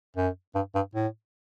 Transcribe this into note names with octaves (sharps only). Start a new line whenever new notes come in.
F#2
G2
G2
A2